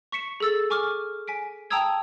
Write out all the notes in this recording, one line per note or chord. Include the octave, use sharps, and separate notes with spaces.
C#6 B6 C#7 E7
G#4 A4 E6 A6
G#5 C#6 D6 F6
G#5 B6 D7
G5 A5 A#5 D#6 E6 G#6